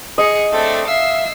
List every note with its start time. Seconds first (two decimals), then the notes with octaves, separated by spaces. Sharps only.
0.18 G#4 D#5 C#7
0.52 A3 C4 D4 A4
0.87 E5 F5 E6 C7